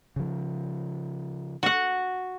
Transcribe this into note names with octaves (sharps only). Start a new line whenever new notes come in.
C#3 F3
F#4 F#5